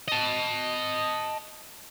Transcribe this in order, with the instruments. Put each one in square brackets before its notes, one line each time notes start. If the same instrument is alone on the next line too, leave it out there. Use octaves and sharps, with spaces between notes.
[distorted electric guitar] D#5 A5